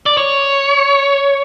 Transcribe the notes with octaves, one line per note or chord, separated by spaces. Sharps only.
D5
C#5